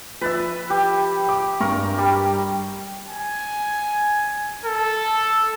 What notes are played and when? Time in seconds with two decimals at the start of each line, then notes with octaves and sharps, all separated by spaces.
0.21 F3 B4 E5 A6
0.70 G4
1.28 G5 D6
1.60 G2 A#4 C#6
1.98 G3
3.08 G#5
4.66 A4